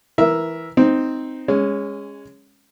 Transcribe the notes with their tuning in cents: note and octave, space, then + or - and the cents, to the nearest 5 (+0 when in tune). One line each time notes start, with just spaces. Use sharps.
E3 -5 A#4 +10 E5 +0
C4 +0 D#4 +0
G#3 -20 C#4 +0